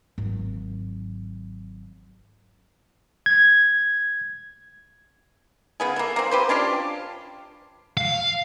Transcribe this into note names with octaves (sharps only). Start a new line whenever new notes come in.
G#1 F#3
G#6
C#3 B3 G#4
A3 A#3
A#3 C4
G4 B4 C5
C#4 D4 F4 G4
F5